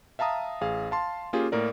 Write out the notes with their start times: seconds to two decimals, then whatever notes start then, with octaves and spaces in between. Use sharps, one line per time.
0.19 E5 F5 A5 A#5 D#6
0.61 A1 G#4 F5
0.91 F5 A5 C6
1.33 A#3 C#4 F4 G4 G#4
1.52 A2 A#3 A#4 D5